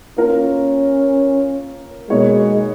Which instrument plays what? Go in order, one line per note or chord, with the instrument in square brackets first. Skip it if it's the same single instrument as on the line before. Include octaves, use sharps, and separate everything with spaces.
[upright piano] A#3 F4 A#4 [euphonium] C#4
[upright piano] B2 A#3 D#4 F#4 C#5 [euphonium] G#3